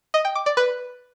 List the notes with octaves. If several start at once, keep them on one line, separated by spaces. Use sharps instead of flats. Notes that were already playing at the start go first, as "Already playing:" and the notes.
D#5
G5
D6
D5
B4